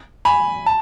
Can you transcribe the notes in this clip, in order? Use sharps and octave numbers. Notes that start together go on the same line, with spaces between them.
G#5 B5
A5